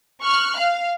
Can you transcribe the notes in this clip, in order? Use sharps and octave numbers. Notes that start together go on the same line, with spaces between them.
C#6 F6 F#6
F5